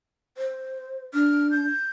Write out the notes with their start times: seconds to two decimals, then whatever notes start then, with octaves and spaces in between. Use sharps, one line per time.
0.38 C5
1.14 D4 F6
1.51 G6